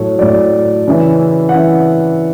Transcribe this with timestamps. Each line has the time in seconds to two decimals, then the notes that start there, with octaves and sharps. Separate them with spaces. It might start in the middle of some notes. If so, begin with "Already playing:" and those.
Already playing: A2 F#3 A4 C#5
0.19 A2 F#3 D5
0.87 C#3 E3
1.49 F#5
1.55 C#3 E3 E5